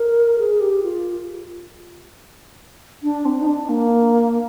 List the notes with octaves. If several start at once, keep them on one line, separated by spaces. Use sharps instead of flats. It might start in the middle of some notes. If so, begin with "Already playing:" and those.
Already playing: A#4
G#4
G4
F4
D4
C4
D#4
D4
A#3